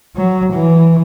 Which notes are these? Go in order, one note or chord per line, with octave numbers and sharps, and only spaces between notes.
F#3
E3